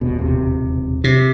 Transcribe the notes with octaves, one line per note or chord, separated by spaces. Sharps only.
D#1 A1 B2
E1 A1 C3
C3